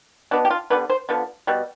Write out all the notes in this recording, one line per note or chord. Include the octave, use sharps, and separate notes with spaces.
B2 B3 D4
G4
F4
D3 G3 B3 B4
C5
D3 F3 B3
B2 G3